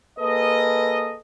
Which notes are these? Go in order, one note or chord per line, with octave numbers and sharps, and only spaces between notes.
A#3 G#4 A4 B4 D#5